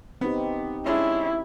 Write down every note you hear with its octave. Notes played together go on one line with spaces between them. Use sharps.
B3 C4 D#4 G4
G#3 C#4 D4 E4